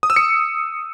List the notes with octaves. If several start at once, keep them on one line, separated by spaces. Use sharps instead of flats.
D#6
E6
C#7